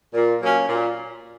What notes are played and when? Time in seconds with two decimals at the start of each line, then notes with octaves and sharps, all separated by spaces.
0.14 A#2
0.41 F#3 A#3 C#4
0.67 A#2